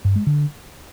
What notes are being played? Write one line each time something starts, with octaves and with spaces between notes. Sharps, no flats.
G2
G#3
D3